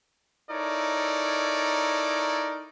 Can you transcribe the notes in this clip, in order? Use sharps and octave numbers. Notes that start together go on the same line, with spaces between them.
D#4 E4 A4 A#4 C#5 D5